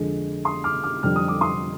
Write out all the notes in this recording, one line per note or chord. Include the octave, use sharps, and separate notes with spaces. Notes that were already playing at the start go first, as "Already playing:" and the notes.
Already playing: F2 D3 G#3
C6 D#6
D6 F6
D6 F6
F2 D3 G3 F6
D#6
D6
C6 D#6